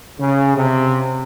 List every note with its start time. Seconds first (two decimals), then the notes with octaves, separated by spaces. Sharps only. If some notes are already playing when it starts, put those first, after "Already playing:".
0.20 C#3
0.56 C3